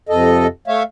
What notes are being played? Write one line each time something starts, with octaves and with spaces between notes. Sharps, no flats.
F2 C3 A4 D#5
A3 C#5 E5 F5